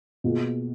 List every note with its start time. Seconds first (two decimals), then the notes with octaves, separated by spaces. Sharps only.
0.24 B2 A#3 F4 G#4